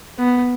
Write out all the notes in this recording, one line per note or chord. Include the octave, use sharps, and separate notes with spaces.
B3